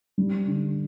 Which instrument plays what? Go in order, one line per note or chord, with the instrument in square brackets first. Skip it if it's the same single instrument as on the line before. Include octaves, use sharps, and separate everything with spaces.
[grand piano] G3
D3